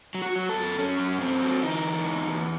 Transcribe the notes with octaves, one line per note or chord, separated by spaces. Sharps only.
F#3
F#4
F#3
A4
F#2
F#2 C#4
F#2
F#2 C4
F#3
E3 D#4
E2
E2
E2